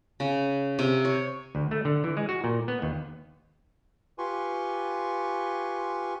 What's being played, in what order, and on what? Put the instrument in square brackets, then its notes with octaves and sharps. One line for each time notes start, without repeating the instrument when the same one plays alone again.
[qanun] C#3
C3
C#5
[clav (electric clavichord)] D2
A3
D3
E3
G#3
F#4
A#2
B3
D#2
[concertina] F4 G4 B4 G#5 C6 C#6